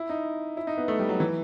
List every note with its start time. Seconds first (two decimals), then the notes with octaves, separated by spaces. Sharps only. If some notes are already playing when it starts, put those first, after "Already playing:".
Already playing: E4
0.09 D#4
0.57 E4
0.67 D#4
0.78 B3
0.88 A3
0.99 G3
1.09 F#3
1.20 E3